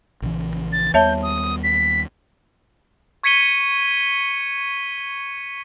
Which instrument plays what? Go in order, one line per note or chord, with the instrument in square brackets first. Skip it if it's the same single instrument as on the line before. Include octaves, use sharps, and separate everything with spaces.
[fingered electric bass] A#1 C#3 E3
[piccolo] A6
[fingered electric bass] D#2 G3 B3 [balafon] C#5 E5 A5 [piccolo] G6
[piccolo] D#6
B6
[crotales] C#6 G#6 B6 C#7 D#7 G7